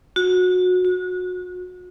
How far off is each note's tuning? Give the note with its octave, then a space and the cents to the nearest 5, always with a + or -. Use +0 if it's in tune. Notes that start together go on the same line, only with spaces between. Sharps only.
F#4 -25
F#4 -35